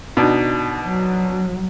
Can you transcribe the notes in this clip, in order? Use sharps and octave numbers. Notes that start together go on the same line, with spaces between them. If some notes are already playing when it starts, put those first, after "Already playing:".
B2 D4 D#4
F#3